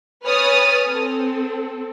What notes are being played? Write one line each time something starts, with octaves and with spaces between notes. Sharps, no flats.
B4 C#5 G#5 D#6 F6 A6
C4 A4